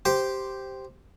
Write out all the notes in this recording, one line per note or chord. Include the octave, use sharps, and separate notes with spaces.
G4 C5